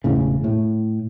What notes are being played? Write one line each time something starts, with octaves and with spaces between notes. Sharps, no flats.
E1 A2 C#3
A2